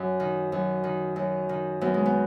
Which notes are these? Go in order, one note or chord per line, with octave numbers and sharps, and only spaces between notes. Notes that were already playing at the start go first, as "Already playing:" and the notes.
Already playing: F#2
D#3
F#2
D#3
F#2
D#3
F#2 B3
G#3
B3